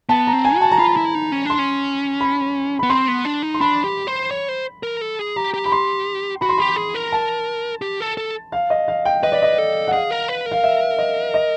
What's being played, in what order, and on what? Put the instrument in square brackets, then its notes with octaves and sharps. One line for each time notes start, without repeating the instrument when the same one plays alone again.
[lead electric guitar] B3 [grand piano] A5
[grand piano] A#5
[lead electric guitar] C4
[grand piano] G#5
[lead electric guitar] F#4 [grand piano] A5
[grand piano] A#5
[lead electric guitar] F4 [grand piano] B5
[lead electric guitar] E4
D#4
C#4
[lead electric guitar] D4 [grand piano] C6
[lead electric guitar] C#4
[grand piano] B5
[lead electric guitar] B3 [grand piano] B5
[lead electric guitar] C4 [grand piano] C6
[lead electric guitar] B3
D4
D#4
[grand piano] C6
[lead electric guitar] D4 [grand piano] B5
[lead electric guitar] G4
C5
C#5
C5
A#4
A4
G#4
[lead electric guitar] G4 [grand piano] A#5
[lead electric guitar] G4
[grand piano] B5
C6
[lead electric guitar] F#4 [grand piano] B5
[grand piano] C6
[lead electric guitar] G4 [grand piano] B5
[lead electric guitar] G#4
A#4
[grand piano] A5
[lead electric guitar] G4
A4
A4
[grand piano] F5
D#5
F5
G5
[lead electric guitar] B4 [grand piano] D#5
[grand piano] D5
D#5
[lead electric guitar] A4
[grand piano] F#5
[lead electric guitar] G#4 [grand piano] F5
[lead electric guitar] A#4
B4
A#4
[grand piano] F5
E5
D#5
D#5